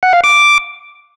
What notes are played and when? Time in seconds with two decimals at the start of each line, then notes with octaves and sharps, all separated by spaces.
0.03 F#5
0.13 F5
0.24 D6